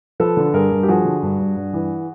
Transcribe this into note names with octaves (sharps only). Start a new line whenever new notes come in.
F3 A4 B4
D3
G2 G#4 A#4
G2
G4
F3 F#4 G#4
D3
G2
G2
G2
E3